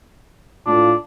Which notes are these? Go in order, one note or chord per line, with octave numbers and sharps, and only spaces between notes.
A2 D4 F4